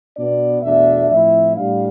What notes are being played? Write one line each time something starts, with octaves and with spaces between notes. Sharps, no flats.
B2 B3 D4 D5
E2 B2 A3 D4 E5
A2 F3 C4 E4 E5
A2 G3 D4 F5